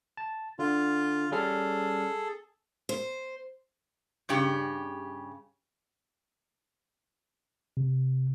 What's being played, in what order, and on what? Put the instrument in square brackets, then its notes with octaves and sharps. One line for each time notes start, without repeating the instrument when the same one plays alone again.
[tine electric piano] A5
[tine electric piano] D3 [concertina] F4
[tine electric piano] G3 C#4 F6 [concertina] G#4 A4
[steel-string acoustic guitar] C5
[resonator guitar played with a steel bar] G2 C#3 G4
[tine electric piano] C3